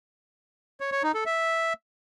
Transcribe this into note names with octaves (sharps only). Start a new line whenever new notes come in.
C#5
C#5
D#4
A4
E5